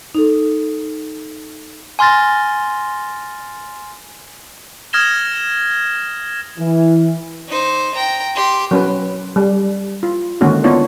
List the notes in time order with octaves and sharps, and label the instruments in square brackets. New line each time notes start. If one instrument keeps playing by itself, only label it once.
[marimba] D#4 A4
[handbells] G#5 C6 F6 A6 A#6
[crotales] D#6 F6 G#6 A#6 E7 G7
[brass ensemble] E3
[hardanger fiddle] D#4 C5
G5 A#5
G4 C6
[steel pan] F#3 C#4 B4
G3
F4
D3 D#3 G#3 A#3 C#4 F#4
B3 D4 D#4 F4 C#5